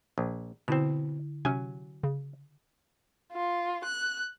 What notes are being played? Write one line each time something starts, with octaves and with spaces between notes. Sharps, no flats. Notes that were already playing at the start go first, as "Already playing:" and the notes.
A#1
B2 D3 C4 E4 E7
C3 F#3 C#4 G#5
C#3
F4
F#6